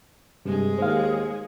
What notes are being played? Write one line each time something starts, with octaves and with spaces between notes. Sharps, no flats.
G2 C3 G#3 G#4
D#2 C5 F5